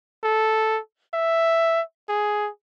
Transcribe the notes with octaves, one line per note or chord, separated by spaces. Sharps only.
A4
E5
G#4